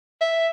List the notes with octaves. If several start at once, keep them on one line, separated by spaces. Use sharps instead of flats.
E5